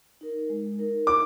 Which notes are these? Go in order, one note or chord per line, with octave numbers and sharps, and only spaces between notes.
D#4 A#4
G#3
D#4 A#4
D#4 D6